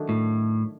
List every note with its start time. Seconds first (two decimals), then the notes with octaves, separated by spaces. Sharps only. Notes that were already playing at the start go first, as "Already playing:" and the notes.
Already playing: D#3 F#3 A3 D4
0.09 A2